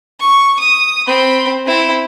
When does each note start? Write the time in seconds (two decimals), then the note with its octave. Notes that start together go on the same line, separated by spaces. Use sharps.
0.20 C#6
0.60 D#6
1.07 C4 B5
1.66 C4 E4